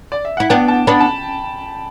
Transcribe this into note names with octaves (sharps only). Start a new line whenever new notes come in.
D5
E5
E4 F#5
B3 D4 G5
A5
B3 D4 B5
A5